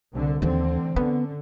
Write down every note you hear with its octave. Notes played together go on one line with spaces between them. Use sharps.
C2 D3
D#2 D3 E3 A3 C4
D3 B3 C#4